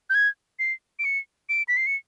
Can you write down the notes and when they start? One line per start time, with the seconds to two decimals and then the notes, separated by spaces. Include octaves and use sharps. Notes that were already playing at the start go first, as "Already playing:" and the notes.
0.10 G6
0.15 G#6
0.59 C7
0.99 D7
1.05 C#7
1.49 D7
1.68 B6
1.77 C7
1.87 C#7